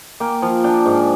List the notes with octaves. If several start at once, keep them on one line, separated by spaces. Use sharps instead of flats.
A#3 G5
F3
D4 G5
G#2